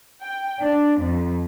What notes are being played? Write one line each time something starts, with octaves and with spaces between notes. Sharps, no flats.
G5
D4
F2